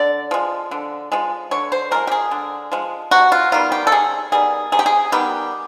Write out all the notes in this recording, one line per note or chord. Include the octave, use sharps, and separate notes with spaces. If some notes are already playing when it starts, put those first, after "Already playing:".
Already playing: D3 D5
F3 G#3
D3
F3 G#3
D3 C#5
C5
F3 G#3 A#4
G4
G#4
D3
F3 G#3
C3 F#4
F4
D#3 G3 B3 F4
G4
A4
C3 G#4
D#3 G3 B3 G#4
C3 G#4
G4
G#4
D#3 G3 B3 G4